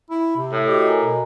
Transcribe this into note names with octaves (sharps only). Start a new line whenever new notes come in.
E4
C3
A2
F#4 G4 D#5
A#4 G#5 A#5
B2